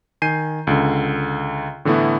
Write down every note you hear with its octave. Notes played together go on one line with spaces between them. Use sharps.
D#3 G#5 G6 C7 D#7
C#2 D3
A2 D3 E3 A3 B3 E4